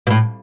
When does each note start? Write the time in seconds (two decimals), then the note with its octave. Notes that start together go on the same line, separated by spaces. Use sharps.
0.07 B2
0.10 A2